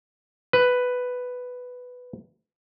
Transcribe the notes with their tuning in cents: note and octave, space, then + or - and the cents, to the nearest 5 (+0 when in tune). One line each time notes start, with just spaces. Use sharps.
B4 +5